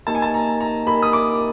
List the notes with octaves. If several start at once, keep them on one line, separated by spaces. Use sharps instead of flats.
A#3 D#4 G4 A#4 D#5 A5
G#5
A5
A#5
A#5
A#3 D#4 G4 A#4 D#5 B5
D#6
D6